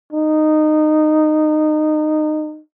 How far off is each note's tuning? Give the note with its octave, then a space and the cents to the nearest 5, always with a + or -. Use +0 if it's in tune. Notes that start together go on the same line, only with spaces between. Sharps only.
D#4 -20